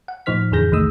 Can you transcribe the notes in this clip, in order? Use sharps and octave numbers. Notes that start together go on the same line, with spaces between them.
F#5
A2 F3 D#4 C5 F6 B6
F2 D3 E3 G#4 G6 A#6
C2 D#3 A3 D#4 D#6 E6